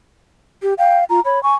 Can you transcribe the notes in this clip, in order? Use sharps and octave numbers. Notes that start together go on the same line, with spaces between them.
G4
F5 G5
F4 A#5
C#5 B5
G#5 C#6